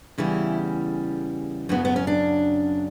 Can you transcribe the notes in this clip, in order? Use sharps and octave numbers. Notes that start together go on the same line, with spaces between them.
E2 C#3 E3 G3 E4
F#2 C#3 F#3 B3
B3
C#4
D4